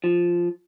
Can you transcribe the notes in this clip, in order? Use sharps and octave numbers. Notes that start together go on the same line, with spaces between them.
F3